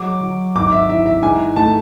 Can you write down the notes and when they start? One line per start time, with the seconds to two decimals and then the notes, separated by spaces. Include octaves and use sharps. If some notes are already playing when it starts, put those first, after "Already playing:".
Already playing: F#3 G#3 D6
0.21 F#3
0.55 G#1 D6
0.72 E5
0.89 E3 E5
1.06 E5
1.22 G#2 G#5
1.56 A3 A5